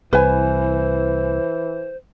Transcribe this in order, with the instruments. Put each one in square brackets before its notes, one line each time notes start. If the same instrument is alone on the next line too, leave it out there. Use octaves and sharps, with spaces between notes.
[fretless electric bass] C2 [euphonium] E3 [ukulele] B4 G#5 [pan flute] C5